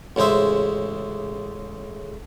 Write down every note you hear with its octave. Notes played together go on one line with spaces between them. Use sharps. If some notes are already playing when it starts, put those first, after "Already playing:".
A1 C#3 G#3 C5 E5